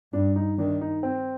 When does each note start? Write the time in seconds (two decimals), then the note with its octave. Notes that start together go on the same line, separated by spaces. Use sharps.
0.13 G2 D4
0.36 D#4
0.58 D#3 D4
0.81 D#4
1.03 C4